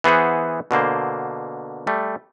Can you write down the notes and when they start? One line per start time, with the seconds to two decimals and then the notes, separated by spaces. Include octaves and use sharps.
0.04 E3 B3 G#4 C5 F#5
0.71 B2 D3 A#3 C5
1.87 G3 A3